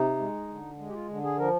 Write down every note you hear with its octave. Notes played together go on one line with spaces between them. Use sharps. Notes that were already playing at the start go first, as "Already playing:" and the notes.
Already playing: C3 D#4
G#3
D3
G#3
G4
F4
D3
G#4
F3 A#4